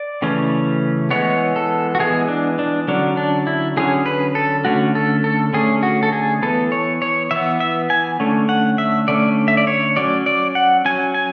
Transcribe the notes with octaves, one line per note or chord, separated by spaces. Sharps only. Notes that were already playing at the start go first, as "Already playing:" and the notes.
Already playing: D5
C#3 E3 A3 C#4
E3 G#3 B3 C#5
A4
F#4
E3 G#3 B3 G#4
D4
D4
D3 F#3 C#4 D4
D4
E4
D3 F#3 C#4 G#4
B4
A4
D3 A3 C#4 F#4
A4
A4
D3 A3 C#4 G#4
F#4
A4
G#4
E3 B3 A4
C#5
C#5
E3 B3 E5
E5
G#5
D3 A3 C#4
F#5
E5
D3 A3 C#4 D5
E5
D5
C#5
F#3 C#4 D5
D5
F#5
F#3 C#4 G#5
G#5